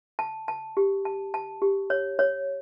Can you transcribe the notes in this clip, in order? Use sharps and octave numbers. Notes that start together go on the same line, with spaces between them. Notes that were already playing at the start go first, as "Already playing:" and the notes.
A5
A5
G4
A5
A5
G4
C#5
C#5